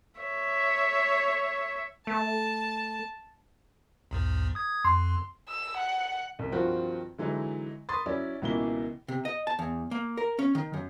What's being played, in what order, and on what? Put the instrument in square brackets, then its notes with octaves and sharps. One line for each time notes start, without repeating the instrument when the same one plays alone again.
[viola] C#5 E5
[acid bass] A3 [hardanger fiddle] A5
[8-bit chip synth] B1 E2 G#2
D#6 G#6
[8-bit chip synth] F2 [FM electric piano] C6
[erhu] E6
F#5
[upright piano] C2
G2 D#3 F3 C4 F4 F#4
D3 E3 F#3 G#3 D#4 E4
B5 C6 D#6 A6
F#3 C#4 E4 D5
C#2 B2 E3 A#3 E4 G7
[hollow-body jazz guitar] C3
D#5
A5
E2
A#3
A#4
C#4
D#3
F#2